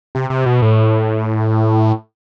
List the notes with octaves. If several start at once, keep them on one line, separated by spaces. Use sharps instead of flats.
C3
C3
B2
A2